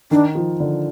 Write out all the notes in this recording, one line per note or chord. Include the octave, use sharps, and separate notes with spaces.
D#3 D4
F3
D3